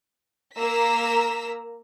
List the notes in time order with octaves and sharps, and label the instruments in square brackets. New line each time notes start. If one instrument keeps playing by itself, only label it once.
[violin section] A#3 A#4 A#5 E6 B6